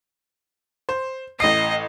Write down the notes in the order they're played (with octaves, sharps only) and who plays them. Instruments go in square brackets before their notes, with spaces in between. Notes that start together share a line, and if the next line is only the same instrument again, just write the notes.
[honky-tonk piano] C5
[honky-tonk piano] A1 C7 [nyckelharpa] D#5